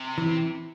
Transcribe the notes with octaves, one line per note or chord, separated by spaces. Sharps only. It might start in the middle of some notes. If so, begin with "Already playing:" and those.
Already playing: C3
E3